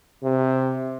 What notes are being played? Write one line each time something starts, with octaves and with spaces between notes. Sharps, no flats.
C3